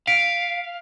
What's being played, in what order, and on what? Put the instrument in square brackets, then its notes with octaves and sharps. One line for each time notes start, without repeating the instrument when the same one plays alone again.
[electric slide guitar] F5 [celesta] B6 D7